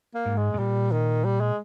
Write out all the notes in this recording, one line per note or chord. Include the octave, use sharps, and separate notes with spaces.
A#3
G#2
G#3
G#2
A#2 G3
D#3
G3
G#3